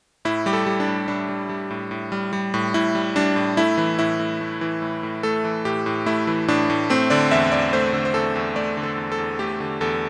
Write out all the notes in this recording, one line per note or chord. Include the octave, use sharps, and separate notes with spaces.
A2 E4
G3 G4
A4
G3
D4
A2
A2 D4
G3
G3
A2
A2
G3
G3
A2
A2 E4
G3
G3 D4
A2
A3 E4
E3
A2 E4
A2
A3
E3
A2
A2
A3 A4
E3
A2 G4
A2
A3 E4
E3
A2 D4
A2
A3 C4
D3 D5
E2 E5
E2 D5
A3 C5
D3
C5
E2 A4
E2
A3 D5
D3
A4
E2
A4
E2
A3 G4
D3
E2 A4